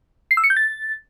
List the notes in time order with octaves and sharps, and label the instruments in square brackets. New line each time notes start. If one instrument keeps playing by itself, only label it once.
[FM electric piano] C7
E6
C#7
G6
A6